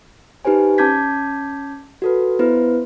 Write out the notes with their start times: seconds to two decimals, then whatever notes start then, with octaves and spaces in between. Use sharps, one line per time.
0.45 D#4 G4 B4 C5 G#5
0.78 C#4 A5 D6 G6 G#6 B6
2.02 F#4 A4 B4
2.39 B3 E4 B4 C5